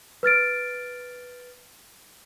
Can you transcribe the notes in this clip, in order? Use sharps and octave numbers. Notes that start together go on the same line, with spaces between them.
B4 F6 A6 D7